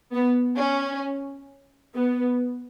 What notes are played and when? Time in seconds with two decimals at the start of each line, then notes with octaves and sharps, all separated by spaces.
0.12 B3
0.58 C#4
1.95 B3